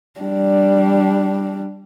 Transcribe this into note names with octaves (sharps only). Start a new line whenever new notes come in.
G3 D4